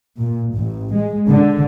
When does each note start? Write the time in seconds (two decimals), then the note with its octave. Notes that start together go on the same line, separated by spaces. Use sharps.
0.18 A#2
0.54 A1
0.94 G#3
1.27 D3